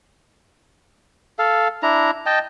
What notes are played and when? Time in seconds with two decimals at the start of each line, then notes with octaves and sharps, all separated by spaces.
1.39 A4 F5
1.83 D4 E4 A#5
2.26 D#5 G5 A5